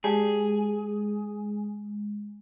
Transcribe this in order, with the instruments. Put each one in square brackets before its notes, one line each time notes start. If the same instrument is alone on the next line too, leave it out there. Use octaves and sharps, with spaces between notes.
[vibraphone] G#3 [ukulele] G4 D5 A5 [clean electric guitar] G#4